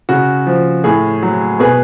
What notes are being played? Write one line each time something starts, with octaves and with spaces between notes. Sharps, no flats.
C#3 F#4
F3
A2 G#4
F#3
B2 G#4 B4